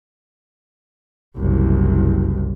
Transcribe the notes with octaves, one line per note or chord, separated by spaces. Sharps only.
F#1 C2